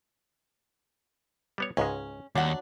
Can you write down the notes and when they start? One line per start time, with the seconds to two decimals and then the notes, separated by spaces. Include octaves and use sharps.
1.58 G3 B3 C#5
1.77 C#2 G#2 G#3 C#4
2.35 D#2 F#3 G3 D4 F#5